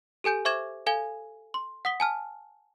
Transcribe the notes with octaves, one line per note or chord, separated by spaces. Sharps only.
G4 A4 G#5 G6 D7
C5 E5 C#6 D6 G#6 E7
A4 F5 G#5 G#6 G7
C6
F#5 D#6 B6 G7
G#5 A5 F6